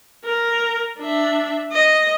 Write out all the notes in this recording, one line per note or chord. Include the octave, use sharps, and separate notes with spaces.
A#4
D4 E5
D#5